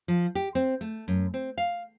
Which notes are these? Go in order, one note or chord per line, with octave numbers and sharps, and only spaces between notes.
F3
G4
C4
A3
F#2
C4
F5